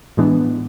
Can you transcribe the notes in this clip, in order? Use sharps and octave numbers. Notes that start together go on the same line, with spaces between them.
A2 E3 G#3 B3 D4